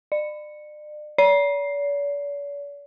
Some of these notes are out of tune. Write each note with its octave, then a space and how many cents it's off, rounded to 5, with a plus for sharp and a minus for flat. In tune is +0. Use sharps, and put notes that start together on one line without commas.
D5 +40
D5 -45